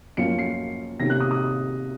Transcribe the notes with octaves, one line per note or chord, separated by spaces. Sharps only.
F#2 F3 A#3 C#4 F4 C#7
C7
C3 D#3 A#3 C#4 A#6
F#6
D#6
D#6